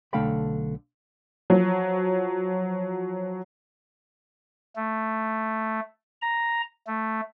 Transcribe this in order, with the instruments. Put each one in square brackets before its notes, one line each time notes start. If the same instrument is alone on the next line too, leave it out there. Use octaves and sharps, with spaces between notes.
[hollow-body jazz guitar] B1 D3 A3 F5 G5 B5
[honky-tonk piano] F3 F#3
[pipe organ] A3
A#5
A3